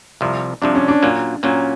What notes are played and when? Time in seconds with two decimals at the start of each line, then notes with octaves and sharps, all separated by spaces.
0.21 C2 C3 F3
0.62 C2 C3 F3 D4
0.75 C#4
0.88 D4
1.03 A#2 F#3 A#3
1.43 A#2 F#3 A#3 C#4